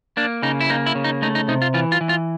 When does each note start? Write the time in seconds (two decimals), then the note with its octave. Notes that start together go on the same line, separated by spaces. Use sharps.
0.17 A#3 D4
0.43 C#3 D#4
0.61 E4
0.70 A#3 D#4
0.86 E4
0.95 C#3
1.04 D#4
1.22 A3 D#4
1.35 D#4
1.48 C3 D#4
1.62 F4
1.74 E3 F4
1.92 F4
2.01 E3
2.09 F4